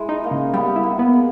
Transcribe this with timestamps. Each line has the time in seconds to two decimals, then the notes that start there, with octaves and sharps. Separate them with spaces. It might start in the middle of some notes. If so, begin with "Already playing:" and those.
Already playing: E3 G#3
0.09 D#4
0.24 A#3
0.31 C#3
0.53 G3 B3
0.76 E4
0.83 A#3
0.99 B3
1.13 G#3